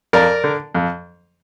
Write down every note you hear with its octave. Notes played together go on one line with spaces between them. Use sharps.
F2 A#4 D5
D3
F2